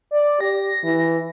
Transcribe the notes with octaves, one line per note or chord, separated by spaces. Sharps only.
D5
G4 A#6
E3